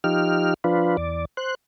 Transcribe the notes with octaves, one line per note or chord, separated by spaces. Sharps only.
F3 D#4 G4 F6
F3 D4 F4 B4
E2 D5
C5 F#6